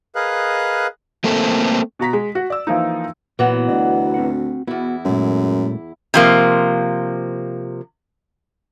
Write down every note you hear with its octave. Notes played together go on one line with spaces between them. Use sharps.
G#4 A#4 B4 D#5 F5 F#6
A3 A#3 C4 A4
B2 F#4 A#5 B6
G#3
F#4
D5 E6
E3 F3 A#3 D#4
A#2 E3 F#3 B3
D2 D5 D#5
C4 F#4 F#5
E2 B3 E4 F#4
F#2 A#2 G#3 A3
C3 F3 A#3